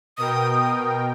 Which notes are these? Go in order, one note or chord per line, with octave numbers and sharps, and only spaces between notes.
B2 A#4 G5 D#6